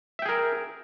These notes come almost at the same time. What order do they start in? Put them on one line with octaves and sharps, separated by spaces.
E5 G5 G#4 A#4